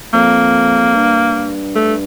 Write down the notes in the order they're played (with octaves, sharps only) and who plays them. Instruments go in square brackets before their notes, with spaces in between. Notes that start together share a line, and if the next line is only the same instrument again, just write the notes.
[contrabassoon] F2 [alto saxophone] A#3
[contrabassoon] G2
[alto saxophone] A3